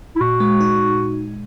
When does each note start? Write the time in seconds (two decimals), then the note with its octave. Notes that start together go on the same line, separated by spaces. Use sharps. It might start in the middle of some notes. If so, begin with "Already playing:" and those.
0.16 E4
0.20 A#2 F#4
0.40 G#3
0.61 D#4